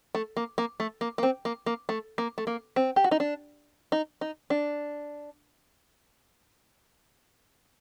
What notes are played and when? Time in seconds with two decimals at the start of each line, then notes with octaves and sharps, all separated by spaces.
0.15 A3
0.37 A#3
0.58 A#3
0.80 A3
1.01 A#3
1.18 A#3
1.23 C4
1.45 A#3
1.66 A#3
1.89 A3
2.18 A#3
2.38 A3
2.47 A#3
2.76 C4
2.96 G4
3.04 F#4
3.11 D#4
3.20 D4
3.92 D#4
4.21 D#4
4.50 D4